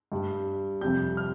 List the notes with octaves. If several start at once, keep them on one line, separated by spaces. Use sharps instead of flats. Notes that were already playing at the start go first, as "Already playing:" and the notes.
G2 G3
F2 C3 G3 G6
F6